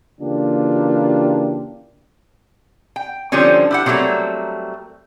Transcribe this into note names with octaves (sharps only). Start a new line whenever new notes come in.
C#3 E3 A#3 D4 F4 G4
G5
D3 F3 G3 C4 C#4
E4 G4 F#5
C3 F#3 G3 A3 A#3 C4